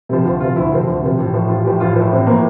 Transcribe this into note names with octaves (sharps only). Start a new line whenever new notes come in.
C3 F3
D2 F4
C3 F3 F4
D2 E4
C3 F3 C4
D2
C3 F3
A1
A2 F3
A1 F4
A2 F3 G4
A1 F4
A2 F3 E4
A1 C4
A2 F3 A#3